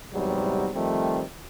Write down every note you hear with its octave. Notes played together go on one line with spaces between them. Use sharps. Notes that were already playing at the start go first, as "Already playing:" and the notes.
E2 G#2 C3 F#3 G3
D#3 F3 G3 A3 C4